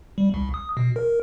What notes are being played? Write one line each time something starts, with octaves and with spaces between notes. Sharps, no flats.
G3
C2
D#6
B2
A#4